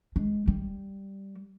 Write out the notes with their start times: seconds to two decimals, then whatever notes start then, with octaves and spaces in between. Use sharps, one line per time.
0.16 G#3
0.47 G3